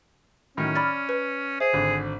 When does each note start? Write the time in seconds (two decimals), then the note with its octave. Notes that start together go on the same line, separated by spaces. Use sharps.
0.57 A2 D#3 F#3 C#4
0.76 D5 B5 F6 A6
1.09 B4
1.60 G#4 C5 E5 D#7
1.73 G#1 D3